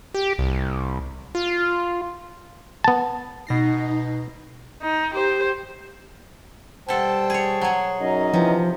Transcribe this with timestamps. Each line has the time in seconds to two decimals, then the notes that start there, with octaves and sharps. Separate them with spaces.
0.14 G4
0.39 C2
1.35 F4
2.84 B3 A5
3.47 B2 D#4 A#6 C7
4.82 D#4
5.14 G4 C5
6.88 B2 G3 A4 C5 G5 A5
7.30 G#4 C#5
7.61 F#3 G#4
8.01 F#2 C#4 D#4 D#5
8.34 C3 E3 F3